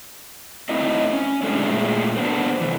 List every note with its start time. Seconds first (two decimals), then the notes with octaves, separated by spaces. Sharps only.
0.69 A3 C4 D#4 E4 D#5
1.13 C#4
1.43 G#3 A3 C4 D4 E4 A4
1.66 A#2 G#3 A3
2.17 A#3 B3 D4 A4 B4 C5
2.61 C3 E3